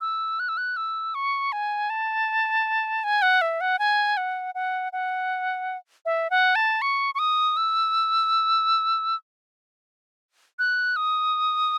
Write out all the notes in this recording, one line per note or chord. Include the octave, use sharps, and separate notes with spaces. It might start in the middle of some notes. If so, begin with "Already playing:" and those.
E6
F#6
E6
F#6
E6
C#6
G#5
A5
G#5
F#5
E5
F#5
G#5
F#5
F#5
F#5
E5
F#5
A5
C#6
C#6
D#6
E6
F#6
D#6